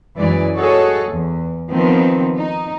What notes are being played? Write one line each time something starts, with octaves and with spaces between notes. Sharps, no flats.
F#2 E3 G#3 D5
F#4 G#4 A4 C#5 D#5
E2
D#3 F3 B3 C4
D#4